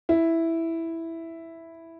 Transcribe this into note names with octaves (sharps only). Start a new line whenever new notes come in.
E4